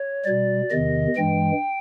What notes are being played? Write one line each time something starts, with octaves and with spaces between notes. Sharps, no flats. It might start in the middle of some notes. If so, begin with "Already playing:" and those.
Already playing: C#5
B2 G3 D5
E2 C3 D#3 D#5
G2 E3 G#3 G5